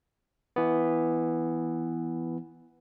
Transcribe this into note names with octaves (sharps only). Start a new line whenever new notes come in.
E3 B3